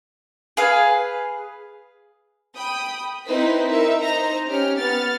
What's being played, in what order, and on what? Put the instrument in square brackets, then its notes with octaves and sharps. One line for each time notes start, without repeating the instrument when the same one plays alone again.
[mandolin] G#4 B4 F5
[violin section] G5 B5 D#6
C4 D#4 E4 B4 C5 B6
D#4 A#4 E5
D#4 C5 A#5
C#4 G4 F6
B3 F6 A6